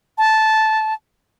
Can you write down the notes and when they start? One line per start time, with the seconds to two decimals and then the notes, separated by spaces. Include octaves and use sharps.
0.18 A5